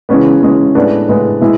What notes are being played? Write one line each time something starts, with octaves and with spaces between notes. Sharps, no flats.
C#3 E3 G#3 B3 C#4
C#3 E3 G#3 B3
A2 G#3 B3 D4
A2 G#3 B3
B2 G#3 E4